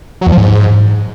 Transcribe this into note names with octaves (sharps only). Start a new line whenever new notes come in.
F#3
E2
F3
G#2